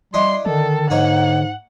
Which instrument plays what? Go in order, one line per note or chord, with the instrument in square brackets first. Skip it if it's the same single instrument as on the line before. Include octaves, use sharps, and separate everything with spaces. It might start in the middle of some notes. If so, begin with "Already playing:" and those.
[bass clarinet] G3 [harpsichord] D4 E4 D#5 [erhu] C6
[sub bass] D3 [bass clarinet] D#3 [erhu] A4
[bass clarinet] G#2 [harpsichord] A#3 D#4 C#5 [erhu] F#5